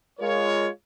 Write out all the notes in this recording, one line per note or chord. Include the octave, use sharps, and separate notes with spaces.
G#3 F4 A#4 C#5